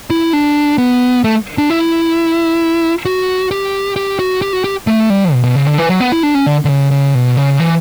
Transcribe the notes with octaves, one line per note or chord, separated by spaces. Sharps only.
E4
D4
B3
A3
D4
E4
F#4
G4
G4
F#4
G4
F#4
G4
A3
G3
B2
B2
C#3
D3
E3
F#3
B3
E4
D4
C#4
D3
D3
C#3
C#3
B2
C#3
E3